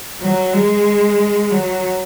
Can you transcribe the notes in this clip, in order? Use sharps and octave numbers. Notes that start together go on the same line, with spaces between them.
F#3
G#3
F#3